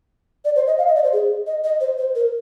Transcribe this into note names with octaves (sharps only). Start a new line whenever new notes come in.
D5
C5
D#5
F5
D#5
D5
C5
G#4
D#5
D#5
C5
C5
A#4